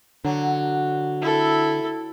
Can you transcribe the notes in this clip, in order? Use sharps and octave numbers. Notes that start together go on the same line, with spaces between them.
D3 F#3
E4 A4